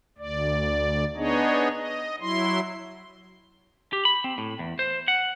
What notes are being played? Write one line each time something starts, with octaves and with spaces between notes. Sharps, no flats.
D2 D5
B3 D4 D#4 G#4 C#5 D#5
D#5
F#3 E4 C6
G4
B5
C4
A2
E2
C5
F#5